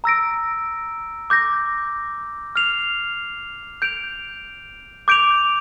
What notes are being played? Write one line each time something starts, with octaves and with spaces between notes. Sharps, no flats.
A#5 E6 A#6 D7
D6 G6 A#6
F6 C7 F7
G6 D7 F7
D6 G6 D7 F7